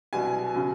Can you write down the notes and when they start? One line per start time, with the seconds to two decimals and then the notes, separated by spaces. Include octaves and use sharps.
0.13 C2 B2 F#3 G#5
0.54 C#3 F#3